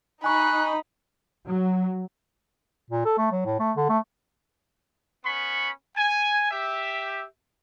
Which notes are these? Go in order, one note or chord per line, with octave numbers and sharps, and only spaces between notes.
D#4 G#5 B5 C#6 F#6
F#3
A#2
A4
A3
F#3
A2
A3
D3
A3
B3 C#4 B5 C#6
G#5
G4 E5